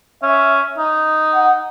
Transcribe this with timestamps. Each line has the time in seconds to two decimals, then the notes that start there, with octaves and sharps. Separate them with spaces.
0.22 C#4 E5
0.78 D#4
1.34 F#5